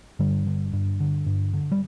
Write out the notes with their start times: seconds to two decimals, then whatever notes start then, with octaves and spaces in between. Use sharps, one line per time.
0.19 G2 D3 G3
0.46 D3
0.73 G2
1.00 D3
1.26 G2
1.54 D3
1.72 G3